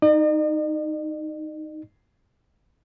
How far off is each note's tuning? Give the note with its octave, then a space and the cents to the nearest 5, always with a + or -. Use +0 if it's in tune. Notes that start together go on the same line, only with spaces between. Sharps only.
D#4 +0 D#5 -45